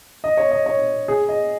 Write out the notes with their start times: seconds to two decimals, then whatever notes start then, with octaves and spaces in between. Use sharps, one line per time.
0.24 D#5
0.37 C#5
0.51 D#5
0.66 C#5
1.08 G#4
1.29 D#5